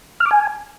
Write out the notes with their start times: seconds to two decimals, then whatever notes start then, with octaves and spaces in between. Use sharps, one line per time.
0.20 F6
0.26 D6
0.31 G#5